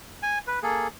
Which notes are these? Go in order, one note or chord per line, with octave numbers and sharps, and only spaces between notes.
G#5
B4
A#3 G#4 A4